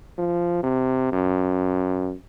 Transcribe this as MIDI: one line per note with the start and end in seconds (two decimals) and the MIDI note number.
0.18 0.59 53
0.63 1.10 48
1.12 2.14 42